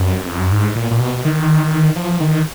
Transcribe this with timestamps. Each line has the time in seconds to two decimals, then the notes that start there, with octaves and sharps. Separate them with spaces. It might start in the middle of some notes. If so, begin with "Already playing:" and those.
Already playing: F#2
0.26 F2
0.39 F#2
0.52 G#2
0.76 A#2
0.91 A#2
1.00 B2
1.25 D#3
1.96 F3
2.20 D#3